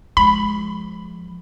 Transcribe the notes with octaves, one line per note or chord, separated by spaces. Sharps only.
F3 G#3 B5